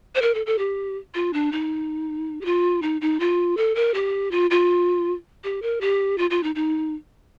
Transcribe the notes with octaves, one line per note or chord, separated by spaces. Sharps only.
C5
A#4
A4
A4
G4
F4
D4
D#4
G4
F4
D#4
D#4
F4
A4
A#4
G4
F4
F4
G4
A#4
G4
F4
F4
D#4
D#4